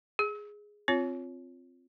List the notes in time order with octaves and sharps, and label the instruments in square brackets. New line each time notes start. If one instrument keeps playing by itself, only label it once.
[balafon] G#4
C4 F4 C#5